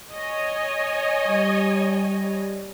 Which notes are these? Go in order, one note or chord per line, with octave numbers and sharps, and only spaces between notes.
C#5 D#5 G#5
G3